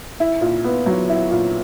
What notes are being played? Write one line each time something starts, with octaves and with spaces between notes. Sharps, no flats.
E4
A#2
B3
F#3
E4
A#2